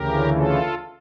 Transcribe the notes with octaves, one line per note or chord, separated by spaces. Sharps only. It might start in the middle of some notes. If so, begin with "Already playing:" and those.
Already playing: D2 C#3 E3 G4 A#4
F4 A4